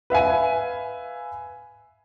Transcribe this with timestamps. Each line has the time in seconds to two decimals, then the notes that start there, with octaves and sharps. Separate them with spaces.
0.10 B4 E5 F5 G#5